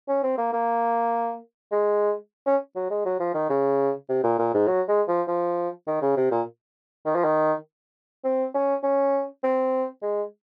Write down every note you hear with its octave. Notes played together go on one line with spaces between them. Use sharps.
C#4
C4
A#3
A#3
G#3
C#4
F#3
G#3
F#3
F3
D#3
C#3
C3
A#2
A#2
G#2
F#3
G#3
F3
F3
D#3
C#3
C3
A#2
D#3
F3
D#3
C4
C#4
C#4
C4
G#3